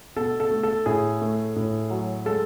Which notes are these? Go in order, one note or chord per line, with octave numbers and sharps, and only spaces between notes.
B2 A4
A4
A3
A4
A2 G#4
A3
A2
F#3
G#3 A4